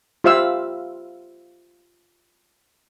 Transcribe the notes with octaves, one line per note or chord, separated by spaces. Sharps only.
F4 G4 C5 E5 F5 E6